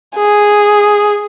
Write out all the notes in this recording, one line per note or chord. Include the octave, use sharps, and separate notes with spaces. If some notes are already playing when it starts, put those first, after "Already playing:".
G#4